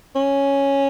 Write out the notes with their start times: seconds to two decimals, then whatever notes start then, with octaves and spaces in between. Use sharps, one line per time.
0.15 C#4